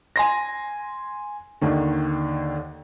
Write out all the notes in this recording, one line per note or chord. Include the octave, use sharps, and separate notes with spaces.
G#5 C6 A#6
D#2 D3 D#3